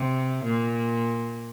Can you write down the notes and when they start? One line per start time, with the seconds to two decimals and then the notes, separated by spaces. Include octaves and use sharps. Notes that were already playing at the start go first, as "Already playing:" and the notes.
Already playing: C3
0.44 A#2